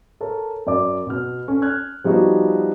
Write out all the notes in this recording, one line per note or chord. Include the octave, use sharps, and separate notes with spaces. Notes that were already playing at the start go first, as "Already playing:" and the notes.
A4 A#4 C#5 A5
F#2 D5 D6
B2 B3 F6
C#4 A4
F6 F#6 G#6
F3 G3 B3 D#4 F#4